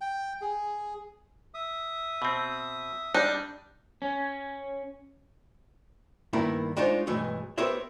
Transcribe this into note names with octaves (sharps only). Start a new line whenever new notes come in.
G5
G#4
E5 D#6
B2 C4
G3 D4 D#4
C#4
G2 D#3 A#3 B3 E4
G#3 D4 D#4 F4 C5 C#5
B1 G2 E3 G#3 A3
B3 G4 A#4 C5 C#5 E5